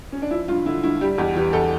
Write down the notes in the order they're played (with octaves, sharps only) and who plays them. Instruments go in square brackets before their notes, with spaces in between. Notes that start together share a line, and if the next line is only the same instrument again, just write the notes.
[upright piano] C#4
D4
F3 E4
G2 F4
D3 E4
G2 E4
G3 G4
E2 G4
E3 G4
E2 A4